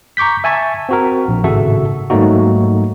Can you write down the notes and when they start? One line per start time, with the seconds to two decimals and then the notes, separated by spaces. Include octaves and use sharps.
0.17 A#5 C#6 D6 G6 B6
0.44 E5 G#5 A5 C#6
0.89 C4 F#4 A#4
1.28 A#1
1.44 G#1 A2 C#3 F#4 A4 E5
2.10 G#2 F#3 A3 A#3 D#4 F#4